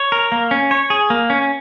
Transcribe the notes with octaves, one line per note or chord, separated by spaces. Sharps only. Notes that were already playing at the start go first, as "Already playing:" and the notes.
Already playing: C#5
A#4
A#3
C#4
C#5
G#4
A#3
C#4